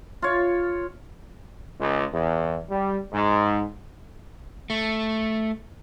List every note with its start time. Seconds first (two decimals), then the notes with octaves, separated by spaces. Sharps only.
0.22 F4 C#5
1.78 C#2
2.12 E2
2.70 G3
3.12 G#2
4.70 A3